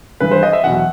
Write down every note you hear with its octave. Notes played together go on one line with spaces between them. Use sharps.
G2 E3 B4
C5
D#5
E5
E2 B2 F#3 F#5